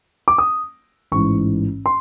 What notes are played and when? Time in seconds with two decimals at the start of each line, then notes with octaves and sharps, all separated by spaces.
0.28 D6
0.38 D#6
1.12 A1 G#2 E3 C#6
1.86 C6